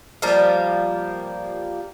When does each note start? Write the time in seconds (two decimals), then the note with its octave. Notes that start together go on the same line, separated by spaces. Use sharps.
0.22 F3 G3 A#3